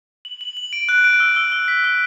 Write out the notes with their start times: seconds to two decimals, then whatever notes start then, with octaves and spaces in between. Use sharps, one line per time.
0.25 F#7
0.41 F#7
0.57 F#7
0.73 D7
0.89 F#6
1.04 D7
1.20 E6
1.36 E6
1.52 E6
1.68 B6
1.84 E6